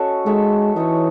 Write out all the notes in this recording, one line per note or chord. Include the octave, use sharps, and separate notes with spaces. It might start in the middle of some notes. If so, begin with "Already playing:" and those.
Already playing: C#4 F#4 A4 D#5
G#3 A3 D#4 A4 E5
E3 D#4 A4 C#5